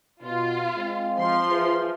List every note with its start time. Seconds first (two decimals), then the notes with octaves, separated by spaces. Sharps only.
0.23 B2 F4
0.77 G#3 C4 F5
1.18 F3 C6
1.50 G#4 B4 E5